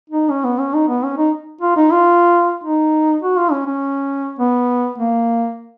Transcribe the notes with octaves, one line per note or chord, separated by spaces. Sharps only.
D#4
C#4
B3
C#4
D#4
B3
C#4
D#4
F4
D#4
F4
D#4
F#4
F4
C#4
C#4
B3
A#3